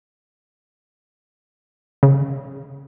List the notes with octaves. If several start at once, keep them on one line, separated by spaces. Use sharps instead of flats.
C#3